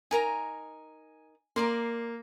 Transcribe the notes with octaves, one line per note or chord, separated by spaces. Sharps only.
D#4 A#4 G#5 A#5
A#3 A#4 D5 C6